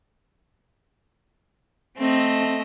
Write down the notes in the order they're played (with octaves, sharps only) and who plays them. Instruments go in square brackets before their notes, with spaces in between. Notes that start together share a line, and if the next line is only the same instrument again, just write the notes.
[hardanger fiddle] A3 D#5 [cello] C4